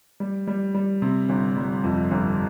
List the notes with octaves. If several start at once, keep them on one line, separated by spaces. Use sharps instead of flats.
G3
G3
G3
C3
G1
G3
F2
G1